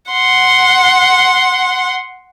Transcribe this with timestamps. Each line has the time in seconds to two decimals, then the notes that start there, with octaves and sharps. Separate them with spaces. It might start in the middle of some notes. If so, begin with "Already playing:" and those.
0.11 F#5 C6